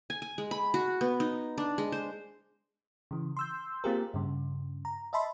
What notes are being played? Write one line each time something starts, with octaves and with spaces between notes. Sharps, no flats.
G#5
G#5
G#3
B5
F#4
B3
D#4
D4
G#3
C5
C#3 E3
C6 E6 G6
A#3 C4 F4 G4 G#4 A#4
G2 C#3
A#5
D#5 E5 A5 B5 C6